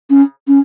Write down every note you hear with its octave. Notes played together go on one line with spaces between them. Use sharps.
C#4
C#4